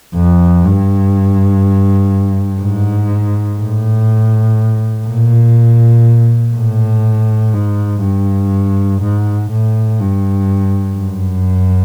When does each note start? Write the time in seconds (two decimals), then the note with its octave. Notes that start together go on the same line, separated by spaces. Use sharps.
0.15 F2
0.65 G2
2.61 G#2
3.59 A2
5.08 A#2
6.55 A2
7.53 G#2
8.03 G2
9.02 G#2
9.51 A2
10.00 G2
10.98 F#2